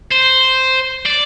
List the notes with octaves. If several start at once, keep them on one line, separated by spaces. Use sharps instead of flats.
C5
D5